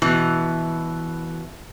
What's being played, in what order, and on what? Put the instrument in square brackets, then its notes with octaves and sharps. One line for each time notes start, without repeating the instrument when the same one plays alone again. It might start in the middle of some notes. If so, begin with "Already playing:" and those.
[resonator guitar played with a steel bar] B2 E3